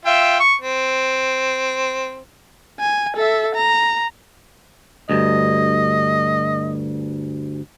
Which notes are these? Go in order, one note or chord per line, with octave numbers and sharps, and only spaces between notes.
F4 E5 G5
C#6
C4
G#5
A4 E5
A#5
D2 G2 D#5